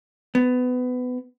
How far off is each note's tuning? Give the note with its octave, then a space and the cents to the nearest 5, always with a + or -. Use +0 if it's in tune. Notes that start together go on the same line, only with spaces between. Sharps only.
B3 +20